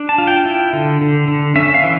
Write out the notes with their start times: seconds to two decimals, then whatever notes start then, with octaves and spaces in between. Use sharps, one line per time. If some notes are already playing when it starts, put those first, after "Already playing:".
Already playing: D4
0.09 A5
0.18 F4
0.27 G5
0.45 E4
0.73 D3
1.01 D3
1.28 D3
1.56 C#4 E5
1.74 F5
1.83 E3